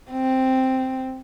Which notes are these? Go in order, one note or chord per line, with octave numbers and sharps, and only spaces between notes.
C4